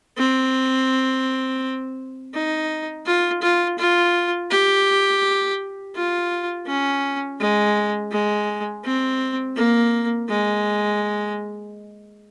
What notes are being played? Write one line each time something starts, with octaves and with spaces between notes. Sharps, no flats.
C4
D#4
F4
F4
F4
G4
F4
C#4
G#3
G#3
C4
A#3
G#3